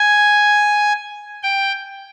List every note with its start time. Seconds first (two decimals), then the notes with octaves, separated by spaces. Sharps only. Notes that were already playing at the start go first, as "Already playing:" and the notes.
Already playing: G#5
1.43 G5